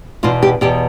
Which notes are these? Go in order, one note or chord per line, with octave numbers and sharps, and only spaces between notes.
E2 B2 F4
G4
E2 B2 G4